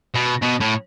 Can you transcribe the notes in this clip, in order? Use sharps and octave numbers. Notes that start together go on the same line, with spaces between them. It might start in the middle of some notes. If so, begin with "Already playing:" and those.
B2
B2
A2